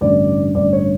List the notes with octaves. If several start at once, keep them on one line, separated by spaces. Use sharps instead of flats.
A1 G2 D3 D5
A1 G2 D3 D5
C#5